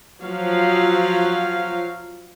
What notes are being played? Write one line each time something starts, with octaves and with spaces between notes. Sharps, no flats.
F3 F#3 F5